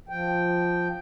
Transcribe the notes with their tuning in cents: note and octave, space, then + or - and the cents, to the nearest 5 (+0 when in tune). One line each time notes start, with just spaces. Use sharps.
F3 +0 G5 +0